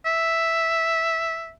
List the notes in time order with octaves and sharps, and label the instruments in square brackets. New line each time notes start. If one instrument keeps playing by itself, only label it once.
[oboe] E5